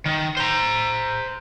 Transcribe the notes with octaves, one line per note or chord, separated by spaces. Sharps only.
D#3
C5 A#5